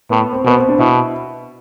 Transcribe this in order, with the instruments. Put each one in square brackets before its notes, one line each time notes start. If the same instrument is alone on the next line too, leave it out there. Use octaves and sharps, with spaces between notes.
[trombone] A2 [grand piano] B3
[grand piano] C4
[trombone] B2 [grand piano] B3
[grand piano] C4
D4
[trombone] B2 [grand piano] E4